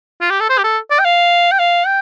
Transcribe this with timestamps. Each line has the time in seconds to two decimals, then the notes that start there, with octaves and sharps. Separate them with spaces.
0.21 F4
0.30 G4
0.40 A4
0.50 C5
0.58 G4
0.64 A4
0.90 D5
0.99 G5
1.05 F5
1.52 G5
1.59 F5
1.86 G5